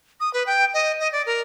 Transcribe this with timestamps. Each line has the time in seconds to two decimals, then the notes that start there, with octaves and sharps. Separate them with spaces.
0.20 D#6
0.33 B4
0.46 G5
0.74 D#5
1.00 D#5
1.12 D5
1.26 A#4